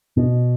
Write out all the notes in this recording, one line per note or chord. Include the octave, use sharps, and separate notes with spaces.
B2